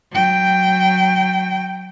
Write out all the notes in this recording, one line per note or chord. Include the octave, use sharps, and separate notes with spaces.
F#3 G5